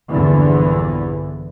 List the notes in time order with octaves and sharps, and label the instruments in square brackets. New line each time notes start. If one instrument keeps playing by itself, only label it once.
[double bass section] A#1 E2 G2 D3 E3